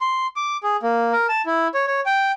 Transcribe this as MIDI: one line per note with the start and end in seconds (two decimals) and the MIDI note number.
0.01 0.27 84
0.36 0.57 86
0.63 0.76 68
0.83 1.12 58
1.12 1.27 70
1.29 1.42 81
1.46 1.68 64
1.74 1.87 73
1.87 2.00 73
2.06 2.32 79